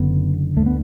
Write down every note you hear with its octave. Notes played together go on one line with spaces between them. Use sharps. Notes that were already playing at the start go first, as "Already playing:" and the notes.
Already playing: F#1 F#2 D3 B3
D2 D3 A3
B3